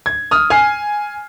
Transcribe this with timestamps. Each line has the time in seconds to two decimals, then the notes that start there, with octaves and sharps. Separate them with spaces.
0.06 G#6
0.31 D#6 F6
0.50 G#5 F6 C7